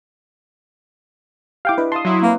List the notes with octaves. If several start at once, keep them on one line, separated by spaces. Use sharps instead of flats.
E4 G4 F5 G5 D6
D4 E4 B4 D#5
F5 A5 C6 D#6
F#3 E4
A#3 C4 B4